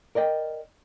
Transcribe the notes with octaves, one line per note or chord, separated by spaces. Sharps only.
A#4 D5 D#5 G5